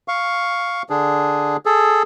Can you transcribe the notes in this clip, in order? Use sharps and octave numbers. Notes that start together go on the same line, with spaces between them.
F5 C#6
D3 D4 G#4
G#4 A4